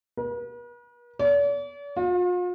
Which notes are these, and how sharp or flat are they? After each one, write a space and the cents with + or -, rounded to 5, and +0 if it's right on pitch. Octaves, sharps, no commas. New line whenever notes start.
B4 -45
D5 -45
F4 +40